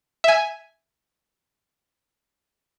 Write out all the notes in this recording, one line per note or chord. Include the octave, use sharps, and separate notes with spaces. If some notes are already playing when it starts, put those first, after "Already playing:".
E5 G#5